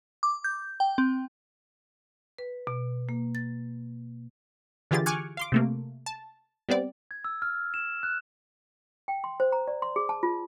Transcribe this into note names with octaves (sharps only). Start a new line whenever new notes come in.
D6
G6
G5
C4
B4
B2
A#3
A6
D3 E3 F4 G4 G#4 A6
G#5 C#6 D6 F6 F#6 G#6
F5 C6 D6
C3 A3 A#3
A5
G3 B3 C4 D5
G#6
E6
F6
E7
F#6
G5
C6
C5
A#5
D5
C6
G#4
A5
F4